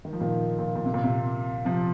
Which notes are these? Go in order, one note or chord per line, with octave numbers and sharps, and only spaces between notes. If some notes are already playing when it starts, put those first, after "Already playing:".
D#3
F3
A#2 D#3
A#2
A#2
C3
A#2
C3
C3 F3